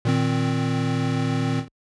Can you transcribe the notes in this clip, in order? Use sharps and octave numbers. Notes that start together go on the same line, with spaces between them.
A#2 D#3 C4